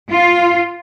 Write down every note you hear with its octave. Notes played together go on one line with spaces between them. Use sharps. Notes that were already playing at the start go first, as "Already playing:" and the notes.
F4